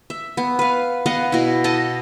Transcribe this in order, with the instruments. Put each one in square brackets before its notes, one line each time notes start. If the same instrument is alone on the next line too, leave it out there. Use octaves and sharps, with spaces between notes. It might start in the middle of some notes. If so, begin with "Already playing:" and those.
[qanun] E5
B3
B4 F5
B3 D#5 F5 F#5
B2 E4
A4 D#5 A5